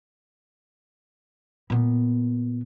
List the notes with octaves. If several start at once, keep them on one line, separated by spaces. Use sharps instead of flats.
A#2 B3